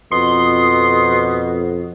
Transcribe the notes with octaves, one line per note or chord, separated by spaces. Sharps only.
F2 B2 C6 D#6